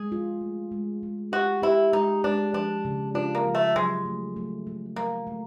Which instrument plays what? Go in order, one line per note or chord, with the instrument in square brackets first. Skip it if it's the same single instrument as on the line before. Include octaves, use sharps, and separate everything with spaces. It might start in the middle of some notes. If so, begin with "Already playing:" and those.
Already playing: [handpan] G#3 [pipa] G#4
[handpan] F4
A3
G#3
G#3
[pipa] F#4 [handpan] G4
[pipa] E4 [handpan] G4
[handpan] G#3 [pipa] D#4
[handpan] G#3 [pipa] D4
[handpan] F3 [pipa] D4
[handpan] C#3
[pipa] D4 [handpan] F4
[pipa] A#3
[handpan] F3
[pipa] A3
[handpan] F#3 [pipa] G#3
[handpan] A3
A3
A3
[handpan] A3 [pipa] A#3
[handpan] A3